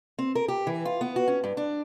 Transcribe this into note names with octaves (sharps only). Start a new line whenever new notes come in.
C4
A#4
G4
E3
F4
B3
F#4
C#4
G2
D4